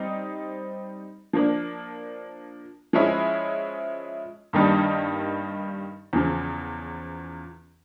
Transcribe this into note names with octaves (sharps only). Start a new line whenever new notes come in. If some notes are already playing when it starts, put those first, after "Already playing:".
Already playing: G3 C4 D#4
F3 A#3 D4
F3 G#3 C#4 E4
G2 D#3 G3 A#3 D#4
E2 C#3 F3